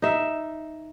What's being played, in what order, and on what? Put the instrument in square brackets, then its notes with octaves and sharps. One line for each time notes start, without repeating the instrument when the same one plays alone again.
[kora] D#4 E5